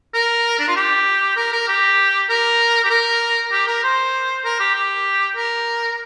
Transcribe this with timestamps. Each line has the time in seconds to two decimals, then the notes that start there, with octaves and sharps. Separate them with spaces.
0.14 A#4
0.59 D4
0.68 F4
0.76 G4
1.36 A#4
1.52 A#4
1.68 G4
2.30 A#4
2.84 G4
2.90 A#4
3.52 G4
3.67 A#4
3.84 C5
4.45 A#4
4.59 G4
4.75 G4
5.36 A#4